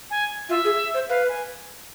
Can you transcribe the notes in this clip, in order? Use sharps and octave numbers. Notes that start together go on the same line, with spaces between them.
G#5
F4 E5
G#4
C5
B4 F5
G#5